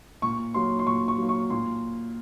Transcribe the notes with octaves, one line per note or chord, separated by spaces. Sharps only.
A#2 C#6
F#3 A#3 C6
C6
A#2 C#6
C#6
F#3 A#3
C#6
A#2 C6